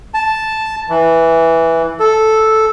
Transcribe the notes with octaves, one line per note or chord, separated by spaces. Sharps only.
A5
E3
A4